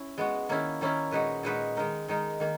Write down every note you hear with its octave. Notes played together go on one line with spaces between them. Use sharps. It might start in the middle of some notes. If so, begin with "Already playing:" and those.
Already playing: C#4 E4
G#3 B3 F#4
D#3 A#3 C#4 E4 A#4
D#3 A#3 C#4 E4 A#4
A#2 G#3 D#4 F#4 B4
A#2 G#3 D#4 F#4 B4
D#3 G#3 D#4 A#4
D#3 G#3 D#4 A#4
D#3 A#3